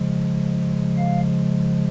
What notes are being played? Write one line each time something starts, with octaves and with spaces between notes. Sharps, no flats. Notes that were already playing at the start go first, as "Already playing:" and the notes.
Already playing: C#3 F3 G#3
F5